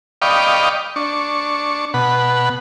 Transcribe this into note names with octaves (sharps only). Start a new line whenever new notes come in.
D5 D#5 F5 G5 B5 C#6
D4 C#6
B2 F#5 B5